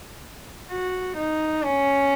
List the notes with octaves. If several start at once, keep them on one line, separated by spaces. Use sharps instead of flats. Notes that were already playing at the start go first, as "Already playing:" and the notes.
F#4
D#4
C#4